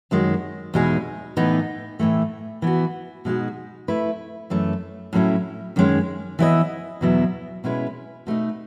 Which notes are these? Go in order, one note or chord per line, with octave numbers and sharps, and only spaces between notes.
F#2 D#3 G#3 C#4 F#4
E2 B2 G#3 D#4 G#4
A2 E3 B3 D#4
A2 E3 A3
E3 B3 F#4
B2 G#3 D#4 F#4
A3 E4 B4
F#2 E3 A3
A2 F#3 C#4 E4
F#2 D#3 G#3 C#4
E3 B3 E4 B4 D#5
E2 B2 F#3 B3 E4
B2 G#3 C#4 E4 B4
B2 A3 D#4